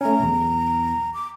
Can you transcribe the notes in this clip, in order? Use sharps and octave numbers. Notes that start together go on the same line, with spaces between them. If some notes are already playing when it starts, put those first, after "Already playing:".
A3 C#4 A#5
B1 E2
D6